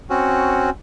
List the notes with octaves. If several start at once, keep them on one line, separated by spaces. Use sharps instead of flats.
C4 C#4 F#4